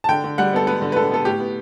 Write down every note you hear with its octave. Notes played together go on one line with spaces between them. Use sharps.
A5
D3 G5
D3
G3 F#5
B3 A4
B3 B4
D3
B4
D3 A4
B3 A4
A2 G4
B3